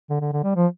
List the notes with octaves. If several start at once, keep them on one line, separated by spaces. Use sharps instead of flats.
D3
D3
D3
G3
F3